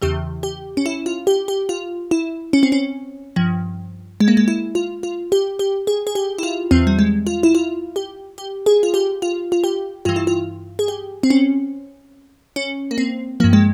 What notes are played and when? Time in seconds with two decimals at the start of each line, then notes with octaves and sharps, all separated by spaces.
0.02 E2 C#3 E3 G4
0.43 G4
0.77 C#4
0.86 E4
1.06 F4
1.27 G4
1.48 G4
1.69 F4
2.11 E4
2.53 C#4
2.63 C4
2.72 C#4
3.36 G2 F3
4.20 G#3
4.28 A#3
4.37 G#3
4.48 E4
4.75 F4
5.03 F4
5.32 G4
5.59 G4
5.87 G#4
6.07 G#4
6.15 G4
6.38 E4
6.43 F4
6.71 E2 E3 C4
6.87 G3
6.99 G#3
7.27 F4
7.43 E4
7.55 F4
7.96 G4
8.38 G4
8.66 G#4
8.83 F4
8.94 G4
9.22 F4
9.52 F4
9.64 G4
10.05 G2 E3 F4
10.16 E4
10.27 F4
10.79 G#4
10.88 G4
11.23 C4
11.30 C#4
12.56 C#4
12.91 A#3
12.98 C4
13.40 G2 F3 A#3
13.53 G#3